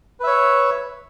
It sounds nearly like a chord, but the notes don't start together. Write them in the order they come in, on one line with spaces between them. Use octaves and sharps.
B4 E5 C#5